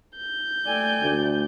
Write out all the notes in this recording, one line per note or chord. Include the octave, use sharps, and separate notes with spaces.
G6
A3 A4 D5 G5 G#5
D2